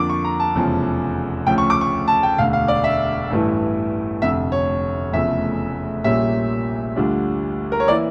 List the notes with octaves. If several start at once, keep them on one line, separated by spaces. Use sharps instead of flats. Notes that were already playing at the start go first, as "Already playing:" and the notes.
Already playing: F2 D3 F3 A#3 D4 D6
C#6
A#5
A5
F1 E2 C#3 F3
D2 C#3 F3 G5
C#6
D6
C#6
A5
G5
E1 D2 D3 F5
F5
D5
E5
A1 G2 E3 A3 E4
F1 F2 D3 E5
C#5
F1 E2 C#3 F3 A3 E5
A#1 A#2 G3 A#3 C#4 E5
D2 D3 G3 D4 F4
A#4
C#5
E3 A#3 E4 D5